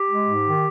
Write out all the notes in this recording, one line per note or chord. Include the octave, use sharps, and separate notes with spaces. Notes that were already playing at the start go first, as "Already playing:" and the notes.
Already playing: G4
G#3
G#2
D#3